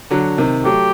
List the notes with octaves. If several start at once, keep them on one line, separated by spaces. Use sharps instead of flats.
D3 F#3
C3 D#3
F#3 A3 G4